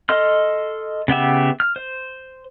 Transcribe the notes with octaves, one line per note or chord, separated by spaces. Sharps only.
A4 D#5 C6 F6
C#3 B3 G4 E5
F6
C5